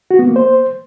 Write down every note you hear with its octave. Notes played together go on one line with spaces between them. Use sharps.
F#4
B3
A#3
C5